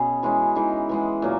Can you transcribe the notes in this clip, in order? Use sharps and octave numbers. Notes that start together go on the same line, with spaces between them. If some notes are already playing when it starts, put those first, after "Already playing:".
Already playing: B2 B3 C#4 G#4
E3 G#3 C#4 E4
E3 G#3 D#4
E3 G#3 B3
A#2 F#3 A#3